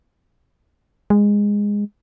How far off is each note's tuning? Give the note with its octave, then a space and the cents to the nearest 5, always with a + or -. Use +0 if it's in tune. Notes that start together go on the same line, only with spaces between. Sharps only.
G#3 -15